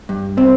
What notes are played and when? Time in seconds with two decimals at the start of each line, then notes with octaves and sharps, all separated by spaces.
0.09 G2
0.37 C3 C4